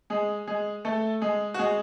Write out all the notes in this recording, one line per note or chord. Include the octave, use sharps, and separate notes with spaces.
G#3 G#4
G#3 G#4
A3 A4
G#3 G#4
F#4
G#3 G#4